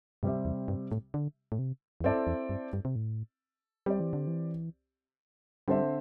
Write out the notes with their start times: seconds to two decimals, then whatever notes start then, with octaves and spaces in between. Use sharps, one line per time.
0.23 G2 C3 G3 C4 G4 E5
0.45 E2
0.68 G2
0.92 A2
1.14 D3
1.52 A2
1.59 C3
2.01 E2
2.04 G2 C4 E4 A4 D5
2.27 E2
2.49 G2
2.73 G2
2.85 C3
2.96 A2
3.86 G3 C4 G4 D5
4.00 E3
4.13 D3
4.27 E3
5.68 D3 G3 C4 A4 C5 E5